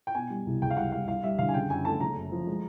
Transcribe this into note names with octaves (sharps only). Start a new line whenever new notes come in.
G5
B2 G#5
G3
C2
C#2 G5
F5
G3 F#5
G3 F5
G3 F5
G3 E5
D3 F5
G#5
C#3 G5
F#2 G#5
A3 A5
F#1 A#5
F#2
F3
G#3